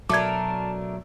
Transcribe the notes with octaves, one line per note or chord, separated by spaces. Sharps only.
B2 F#3 A3 D4 A#4 A5 D6 G#6